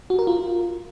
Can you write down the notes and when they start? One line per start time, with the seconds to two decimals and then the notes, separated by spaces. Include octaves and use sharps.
0.10 F#4
0.19 A#4
0.27 F4